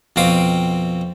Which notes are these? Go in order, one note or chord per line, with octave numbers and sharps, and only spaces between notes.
F2 B2 C4 F5 D6 D#6